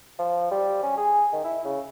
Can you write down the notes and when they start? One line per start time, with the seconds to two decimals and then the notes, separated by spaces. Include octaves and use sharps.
0.19 F3
0.51 G3
0.83 C#4
0.97 G#4
1.33 D#3
1.44 E4
1.64 C#3